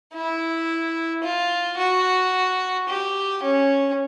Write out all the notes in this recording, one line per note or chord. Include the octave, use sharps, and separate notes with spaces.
E4
F4
F#4
G4
C#4